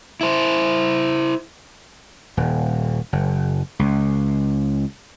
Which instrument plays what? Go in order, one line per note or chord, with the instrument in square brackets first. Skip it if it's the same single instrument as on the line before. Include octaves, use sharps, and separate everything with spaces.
[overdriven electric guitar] E4 C5
[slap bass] D#1
F#1
C#2